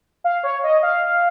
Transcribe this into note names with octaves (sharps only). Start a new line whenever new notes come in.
F5
C#5
D#5
F5